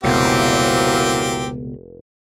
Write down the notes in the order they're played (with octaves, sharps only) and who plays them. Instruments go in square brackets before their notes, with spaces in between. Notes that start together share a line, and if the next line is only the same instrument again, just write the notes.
[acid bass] F1 [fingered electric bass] C#2 B2 [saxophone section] E3 F#3 A#3 [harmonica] C4 G4